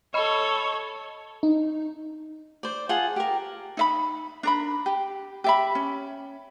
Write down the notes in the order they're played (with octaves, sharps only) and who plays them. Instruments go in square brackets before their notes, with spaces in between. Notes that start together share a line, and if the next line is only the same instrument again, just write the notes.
[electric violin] A4 C#5 [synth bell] D#5 B5
[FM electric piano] D#4
[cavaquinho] C5 D5
F4 G#4 F#5 A5
G4 A#4
[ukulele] D#4 E5 B5
D4 A#4 B5
G4
G4 E5 B5
C#4